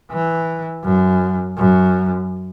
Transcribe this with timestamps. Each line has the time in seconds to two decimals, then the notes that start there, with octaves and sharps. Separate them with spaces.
0.11 E3
0.85 F#2
1.58 F#2